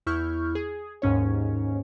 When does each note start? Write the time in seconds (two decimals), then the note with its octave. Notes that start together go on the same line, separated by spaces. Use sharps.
0.06 E2 E4 C#6 F6 G6
0.55 G#4
1.02 D#2 G#2 C#4 C#5